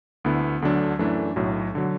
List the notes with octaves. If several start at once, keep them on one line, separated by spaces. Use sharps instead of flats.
D2 D3 B3 E4
D2 D3 F#3 D4
F#2 E3 A3 D4
B1 A2 F#3
D3 F#3